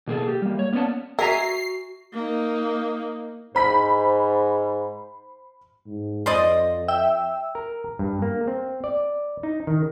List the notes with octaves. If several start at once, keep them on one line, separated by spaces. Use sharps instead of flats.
B2 A#3 G#4 A4
G4
G3 A#3
C#5
A#3 B3 C#4 D5 F#5 A5
F#4 A#4 E5 G#5 A#5 C7
A#3 D#4
G#2 C5 B5 B6
G#2
F2 C5 D5 D#5
E5 G5 E6
A#4
G2
A#3
C4
D5
D#4
D#3